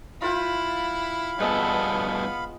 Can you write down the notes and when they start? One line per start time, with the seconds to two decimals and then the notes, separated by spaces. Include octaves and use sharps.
0.22 E4 F4 B4 F5 G5 B5
1.40 G2 B2 G#3 B3 A4